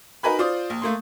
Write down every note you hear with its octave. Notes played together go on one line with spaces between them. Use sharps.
D#4 F#4 A#4 B4 G#5 B5
F4 C5 D5 D#6
A#1
A3 A#3 C6